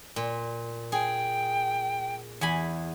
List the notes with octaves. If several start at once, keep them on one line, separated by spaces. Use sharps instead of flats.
A#2
G#4 G5
E2 G#5 B5